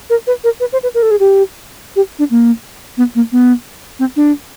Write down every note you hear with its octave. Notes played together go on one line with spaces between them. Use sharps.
A#4
B4
A#4
B4
C5
B4
A#4
A4
G#4
G4
G4
D4
A#3
B3
A#3
B3
C4
D4